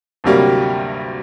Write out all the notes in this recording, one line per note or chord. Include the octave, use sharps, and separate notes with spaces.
D2 G2 C3 F#3 G3 A#3